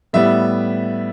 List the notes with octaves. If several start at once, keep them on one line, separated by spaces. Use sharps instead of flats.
A2 G3 B3 E5